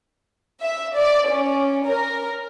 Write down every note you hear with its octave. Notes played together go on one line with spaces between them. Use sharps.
E5
D5
C#4
A#4